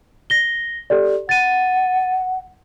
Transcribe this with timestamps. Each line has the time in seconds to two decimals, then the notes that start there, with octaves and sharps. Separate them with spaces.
0.30 A#6 G7
0.90 G4 A4 D5
1.29 F#5 A6 D#7